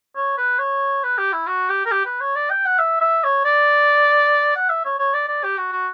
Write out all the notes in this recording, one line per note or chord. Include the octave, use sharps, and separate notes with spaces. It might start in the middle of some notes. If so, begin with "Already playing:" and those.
C#5
B4
C#5
B4
G4
E4
F#4
G4
A#4
G4
B4
C#5
D5
G5
F#5
E5
E5
C#5
D5
F#5
E5
C#5
C#5
D5
D5
G4
F#4
F#4